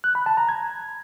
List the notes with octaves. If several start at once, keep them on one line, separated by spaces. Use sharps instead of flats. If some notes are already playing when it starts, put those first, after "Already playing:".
F#6
B5
A5
A#5
G#6